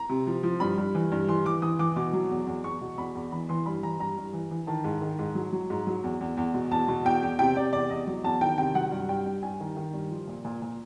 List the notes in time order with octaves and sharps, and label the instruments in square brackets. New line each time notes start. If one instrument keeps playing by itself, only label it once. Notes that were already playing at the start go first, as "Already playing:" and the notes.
Already playing: [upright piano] A#5
C3
F3
F3
G2 B5
G2
E3
G2
E3 C6
E3 D6
E3 D#6
E3 D6
B2 D6
F#3
E2
E2
E2 C#6
B2
E2 B5
E2
E3 B5
E3 C6
G2 B5
E3 A#5
G2 A#5
G2
E3
E3
D#3 A5
G#2
D#3
G#2
F#3
F#3
G#2
F#3
E2
E2
E2
B2
E2 A5
B2
E2 G5
E2
C3 G5
C3 D5
E2 D5
E2 D#5
F#3
E2 A5
D#3 G5
C3 G5
F#3 F#5
G2
G2 G5
G2
G2 G#5
D#3
D#3
G2
F3
A#2
A#2
A#2